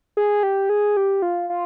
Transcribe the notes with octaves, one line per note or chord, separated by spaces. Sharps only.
G#4
G4
G#4
G4
F4
F4